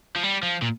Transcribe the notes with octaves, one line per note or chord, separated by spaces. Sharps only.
F3
G3
F3
A#2